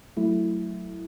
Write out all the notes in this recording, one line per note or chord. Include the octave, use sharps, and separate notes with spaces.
F#3 A3 E4